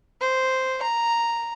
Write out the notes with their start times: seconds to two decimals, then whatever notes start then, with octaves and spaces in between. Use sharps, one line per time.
0.21 C5
0.82 A#5